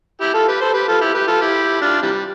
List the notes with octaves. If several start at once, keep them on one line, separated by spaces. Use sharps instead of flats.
E4 G4
F4 A4
G4 B4
A4 C5
G4 B4
F4 A4
E4 G4
G4 B4
F4 A4
E4 G4
D4 F4
C3 E3 G3